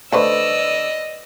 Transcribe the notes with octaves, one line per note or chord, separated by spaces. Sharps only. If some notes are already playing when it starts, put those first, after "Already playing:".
D3 A3 A4 B4 C5 D5 D#5 E6